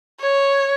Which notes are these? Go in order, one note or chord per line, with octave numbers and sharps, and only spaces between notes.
C#5